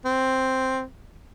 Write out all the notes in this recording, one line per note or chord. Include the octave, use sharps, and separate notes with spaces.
C4